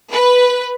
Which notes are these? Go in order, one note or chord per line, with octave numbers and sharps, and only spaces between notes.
B4